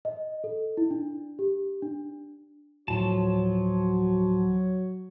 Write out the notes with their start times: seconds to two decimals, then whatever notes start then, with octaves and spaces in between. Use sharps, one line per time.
0.05 D#5
0.44 A4
0.77 E4
0.91 D4
1.39 G4
1.82 D4
2.88 D2 A2 F3 F#3 F#4 C#5 A5